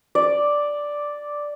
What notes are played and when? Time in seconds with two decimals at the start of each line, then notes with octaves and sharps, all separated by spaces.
0.15 D5